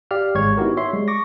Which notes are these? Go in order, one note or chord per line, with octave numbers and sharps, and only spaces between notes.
G4 D5 F5 F6
G#1 G#3 C#5 C#6 G#6
B3 D#4 E4 F#4 G4 A#4
C#5 E5 C6
G3 G#3
C#6 D6 A#6